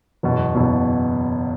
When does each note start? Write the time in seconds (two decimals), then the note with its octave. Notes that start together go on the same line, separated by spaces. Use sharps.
0.23 F#1 E2 B2 B3
0.55 F#1 E2 B2